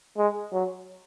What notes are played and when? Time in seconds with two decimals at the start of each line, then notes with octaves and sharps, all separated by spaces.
0.18 G#3
0.53 F#3